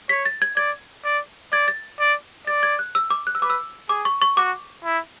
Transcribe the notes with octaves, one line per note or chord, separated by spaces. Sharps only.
C#5 B6
A6
G#6
D5 G#6
D5
D5 G#6
A6
D5
D5 A6
G#6
F#6
E6
D6
F#6
E6
B4 D6
E6
G#4 D6
C#6
C#6
F#4 D6
E4